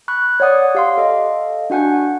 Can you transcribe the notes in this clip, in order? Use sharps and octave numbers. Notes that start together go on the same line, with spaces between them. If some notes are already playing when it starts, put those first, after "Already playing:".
B5 C#6 F#6
C#5 D5 F#5 D#6
G4 F5 C6
A4 D#5 F5
D4 F#4 F#5 G#5 G6